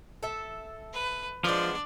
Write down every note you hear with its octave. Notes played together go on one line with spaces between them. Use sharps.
A4 E5
B4
F3 G#3 B3 D4 D5